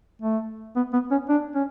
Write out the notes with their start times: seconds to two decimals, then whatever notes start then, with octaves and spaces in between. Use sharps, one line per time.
0.22 A3
0.76 B3
0.93 B3
1.11 C#4
1.29 D4
1.55 C#4